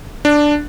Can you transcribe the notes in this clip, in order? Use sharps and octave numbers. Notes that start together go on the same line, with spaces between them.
D4